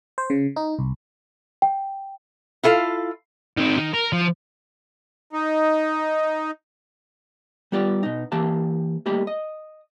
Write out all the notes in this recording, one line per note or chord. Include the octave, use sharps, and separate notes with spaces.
C5
C#3
D#4
C2
G5
E4 F4 A4 F5
D#3 C4
D#3
A#4
F3
D#4
G3 B3 F4 G4 D5
B2 D#4
E3 A#3 G4 F5 A5
G3 A3 A#3 D#4 G4 B5
D#5